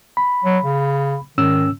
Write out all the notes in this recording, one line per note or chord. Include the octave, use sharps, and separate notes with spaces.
B5
F#3
C#3
G#2 D#3 C#4 E6